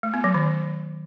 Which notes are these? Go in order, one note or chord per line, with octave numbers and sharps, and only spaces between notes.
A3
B3
F#3
D#3